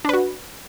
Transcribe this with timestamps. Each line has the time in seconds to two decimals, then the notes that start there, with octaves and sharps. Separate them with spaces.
0.05 D4
0.09 B4
0.13 F#4